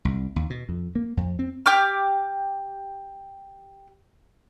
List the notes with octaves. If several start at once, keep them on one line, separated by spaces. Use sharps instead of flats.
C2
D#2
B2
F2
A#3
F2
C4
G4 D6 F6